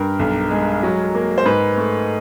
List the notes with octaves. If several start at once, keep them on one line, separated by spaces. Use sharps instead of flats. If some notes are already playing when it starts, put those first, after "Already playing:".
Already playing: G2 A#4
B1
G#3
F#3
A#3
C5
G#2 B4
A3